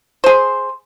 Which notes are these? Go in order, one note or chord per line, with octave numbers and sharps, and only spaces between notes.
G#4 C5